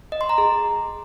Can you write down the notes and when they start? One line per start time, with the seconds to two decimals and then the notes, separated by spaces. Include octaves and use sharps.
0.12 D#5
0.21 C6
0.29 A#5
0.38 G#4